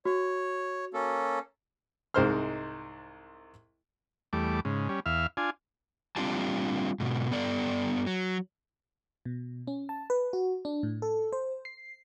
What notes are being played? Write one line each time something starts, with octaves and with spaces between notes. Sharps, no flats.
F#4 C#5
A#3 C#4 A4
C2 G#2 G#3 C5 C6 F6
E2 G3 A3 D6
G#2 C#3
G3 C#4
E2 E5 F5 F6
D4 F4 G#5
G3 C4 D4 F4 G4 A5
G#2 B2
G2 B3 A4 D5
F#3
B2
C#4
A5
B4
F#4
D4
A2
A4
C5
C7